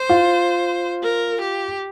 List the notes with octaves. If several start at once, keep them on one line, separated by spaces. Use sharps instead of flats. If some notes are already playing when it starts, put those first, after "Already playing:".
Already playing: C5
F4
A#4
G4